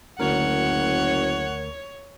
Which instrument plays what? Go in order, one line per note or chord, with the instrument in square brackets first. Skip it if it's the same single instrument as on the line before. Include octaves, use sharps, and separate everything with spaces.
[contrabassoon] F#1 [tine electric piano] D2 A#4 [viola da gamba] C#5 [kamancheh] F#5